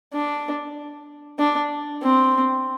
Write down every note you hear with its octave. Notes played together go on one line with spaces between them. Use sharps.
D4
D4
C4